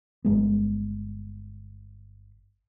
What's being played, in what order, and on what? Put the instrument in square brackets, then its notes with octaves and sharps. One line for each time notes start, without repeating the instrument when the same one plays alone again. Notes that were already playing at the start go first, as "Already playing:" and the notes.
[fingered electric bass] G1 G#3 B3